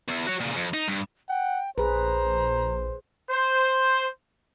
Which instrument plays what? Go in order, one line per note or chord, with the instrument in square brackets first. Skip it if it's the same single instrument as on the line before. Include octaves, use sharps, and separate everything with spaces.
[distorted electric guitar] E2
F#4 C#5
A#2 C#3
F2
D#4
G2
[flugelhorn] F#5 [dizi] G5
[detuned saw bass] A#1 [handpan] G#4 B4 [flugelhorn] C5 [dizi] A#5
[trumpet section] C5